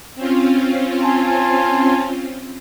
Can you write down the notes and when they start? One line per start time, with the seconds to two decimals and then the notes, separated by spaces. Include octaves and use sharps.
0.15 C4 C#4 F4
1.03 G#5 A5 C6